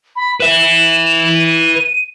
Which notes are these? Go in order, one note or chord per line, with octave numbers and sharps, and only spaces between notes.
B5
B4 E5 E7
D#7